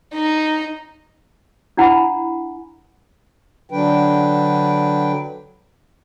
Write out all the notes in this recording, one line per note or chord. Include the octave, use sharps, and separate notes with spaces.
D#4
D4 E4 F#5 G#5 A#5 B5
D3 F#3 D4 B4 G5